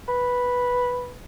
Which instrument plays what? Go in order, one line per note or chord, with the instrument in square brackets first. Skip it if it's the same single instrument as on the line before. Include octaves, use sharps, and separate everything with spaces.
[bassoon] B4